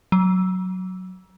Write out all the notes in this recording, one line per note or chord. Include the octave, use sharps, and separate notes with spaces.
F#3